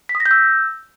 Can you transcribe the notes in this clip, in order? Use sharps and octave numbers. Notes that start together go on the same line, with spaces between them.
B6
D#6
A#6
G6
E6